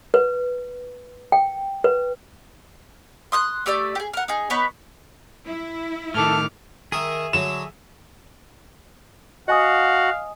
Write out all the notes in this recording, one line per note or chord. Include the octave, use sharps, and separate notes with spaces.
B4
G5
B4
C6 D#6 F#6
A3 G4 D5 E6
G4 G#4
A#4 F#5
D#4 G#4
B3 D#4 B4 C#5
E4
A2 D#3 A4 D6 F6
D#3 G#4 A#4 E5 D#6
D3 F#3 E7
F#4 D#5 F5 F#5 G#5 D#6